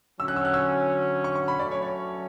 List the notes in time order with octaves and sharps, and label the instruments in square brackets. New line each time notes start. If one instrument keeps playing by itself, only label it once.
[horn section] D3 F#3 C#4 F#4 [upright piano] E6
[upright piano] F#6
E6
F#6
E6
C#6
C#6
B5
[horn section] F#3 A3 C#4 [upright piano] D5
[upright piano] C#5
C#5